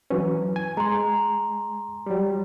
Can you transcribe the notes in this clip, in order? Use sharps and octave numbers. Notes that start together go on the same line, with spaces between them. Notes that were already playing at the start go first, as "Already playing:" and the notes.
E3 F#3 C#4 B4
G#5
G#3 G#5 A#5 C6
F#3 G3